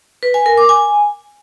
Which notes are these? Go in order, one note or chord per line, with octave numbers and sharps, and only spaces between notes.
B4
G#5
A#4
D6
G#5